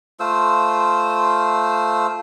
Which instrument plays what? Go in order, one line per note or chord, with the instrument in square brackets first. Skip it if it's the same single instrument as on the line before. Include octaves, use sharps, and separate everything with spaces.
[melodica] A3 F4 C5 E6